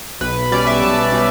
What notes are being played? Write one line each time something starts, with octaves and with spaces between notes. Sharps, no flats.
B1 B4
B2 G3 C#4 D5
E5
B1 A5
B2 G3 C#4